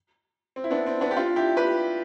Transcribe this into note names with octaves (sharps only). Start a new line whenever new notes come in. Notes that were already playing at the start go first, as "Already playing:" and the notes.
C4
E4
B3 D4
C4
B3 D4
G4
D4 F4
E4 G4
G4 B4